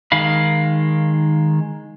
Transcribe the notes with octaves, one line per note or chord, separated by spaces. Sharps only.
D#3 G#3 F5 B5